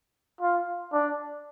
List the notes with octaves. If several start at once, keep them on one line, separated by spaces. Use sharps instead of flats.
F4
D4